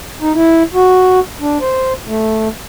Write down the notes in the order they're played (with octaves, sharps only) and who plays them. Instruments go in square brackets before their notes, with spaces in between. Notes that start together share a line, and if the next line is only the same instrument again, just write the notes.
[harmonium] D#4
E4
F#4
D4
C5
A3